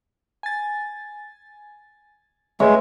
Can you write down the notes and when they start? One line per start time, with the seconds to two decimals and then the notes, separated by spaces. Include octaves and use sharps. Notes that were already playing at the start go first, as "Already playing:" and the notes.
0.43 G#5 A6
2.60 G#3 A3 B4 C#5 E5